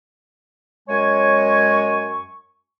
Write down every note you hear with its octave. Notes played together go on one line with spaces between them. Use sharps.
F#2 G#3 C#5 G#5 C#6